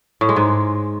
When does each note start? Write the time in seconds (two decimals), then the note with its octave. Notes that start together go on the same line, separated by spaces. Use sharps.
0.21 A2
0.29 G#3
0.36 G#2